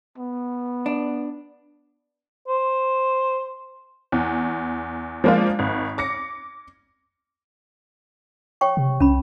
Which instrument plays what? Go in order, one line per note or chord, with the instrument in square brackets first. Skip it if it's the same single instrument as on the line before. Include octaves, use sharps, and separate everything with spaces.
[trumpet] B3
[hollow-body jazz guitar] D4
[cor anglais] C5
[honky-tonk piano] E2
F3 G#3 A#3 D4 F4
G#1
D6 A#6 C#7
[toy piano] C#5 G5 C#6
[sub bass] C3
[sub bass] C2 [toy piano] C#4 B5